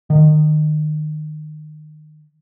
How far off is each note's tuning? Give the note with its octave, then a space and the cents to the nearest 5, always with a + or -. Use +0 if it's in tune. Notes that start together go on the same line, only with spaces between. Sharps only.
D#3 -25